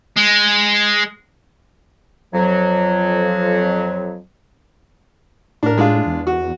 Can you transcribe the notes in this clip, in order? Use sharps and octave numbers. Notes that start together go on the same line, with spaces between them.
G#3
F2 F#3
A2 D4 A#4
G#3 D4 F4
E2
F#4